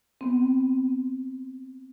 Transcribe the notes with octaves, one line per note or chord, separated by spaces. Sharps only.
B3 C4